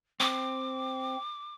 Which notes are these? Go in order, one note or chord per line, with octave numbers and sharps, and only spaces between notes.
C4 D6